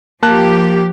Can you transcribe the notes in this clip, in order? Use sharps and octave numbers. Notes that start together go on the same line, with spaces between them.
F3 A#3 G4 A5 F#6